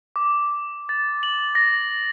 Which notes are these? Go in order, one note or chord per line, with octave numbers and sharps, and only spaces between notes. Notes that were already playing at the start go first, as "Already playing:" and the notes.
D6
A6
F#7
A#6